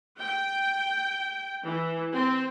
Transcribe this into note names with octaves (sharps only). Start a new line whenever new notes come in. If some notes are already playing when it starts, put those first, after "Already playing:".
G5
E3
C4